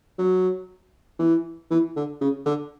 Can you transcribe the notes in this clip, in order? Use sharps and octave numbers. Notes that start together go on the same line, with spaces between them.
F#3
E3
E3
D3
C#3
D3